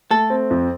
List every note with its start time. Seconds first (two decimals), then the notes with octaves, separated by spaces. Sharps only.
0.11 A3 A4
0.30 C4
0.50 F2